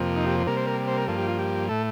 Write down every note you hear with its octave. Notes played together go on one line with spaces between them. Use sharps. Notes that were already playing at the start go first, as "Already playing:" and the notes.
Already playing: F2 C3 F3 A#3
D#4
G4
C3 G3 A#3 A#4
C5
A#4
C5
A#4
G2 F3 A#3 A4
G4
F4
G4
A2 A3 A4